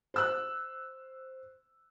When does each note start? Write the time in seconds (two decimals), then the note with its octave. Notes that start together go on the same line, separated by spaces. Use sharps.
0.14 C5 E6 F#6